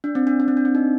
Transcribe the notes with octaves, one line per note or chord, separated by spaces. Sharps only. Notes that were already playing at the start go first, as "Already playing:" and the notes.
D4
C4
D4
D4
C4
D4
C4
D#4